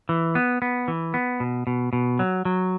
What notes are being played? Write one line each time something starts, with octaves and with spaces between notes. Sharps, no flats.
E3
B3
B3
E3
B3
B2
B2
B2
F#3
F#3